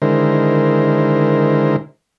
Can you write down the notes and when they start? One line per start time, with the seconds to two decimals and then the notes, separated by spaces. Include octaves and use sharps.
0.02 D3 D#3 G#3 E4 A#4 C5